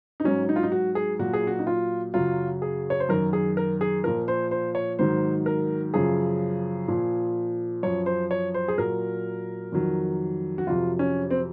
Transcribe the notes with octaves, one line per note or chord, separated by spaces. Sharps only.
D#4
G#2 F#3 C#4
D#4
F4
D#4
F#4
G#4
A#2 F#3 F#4
G#4
F#4
D#4
F4
F#2 C#3 F#3 F4
G#4
C#5
C5
F#2 D#3 F#3 A#4
G#4
A#4
G#4
A#2 F3 A#4
C5
C5
C#5
G#2 D#3 F#3 C5
A#4
F#2 C#3 F3 G#4
A#2 F3
F#2 F3 C#5
C5
C#5
C5
G#4
A#2 F#3 A#4
F2 D#3 F#3
F#4
F2 C3 F#3 F4
C#4
C4